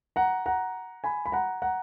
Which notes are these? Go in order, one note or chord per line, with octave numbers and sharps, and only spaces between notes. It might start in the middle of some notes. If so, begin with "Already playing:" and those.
F#5 A#5
F#5 A#5
G#5 B5
B5
F#5 A#5
F#5 A#5